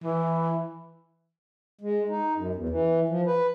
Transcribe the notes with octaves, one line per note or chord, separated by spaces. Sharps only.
E3
G#3
D#4
F#2
E2
E3
F3
B4